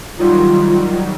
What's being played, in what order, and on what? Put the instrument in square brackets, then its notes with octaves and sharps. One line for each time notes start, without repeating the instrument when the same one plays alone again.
[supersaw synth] D#3 F#3 G3 [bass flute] F4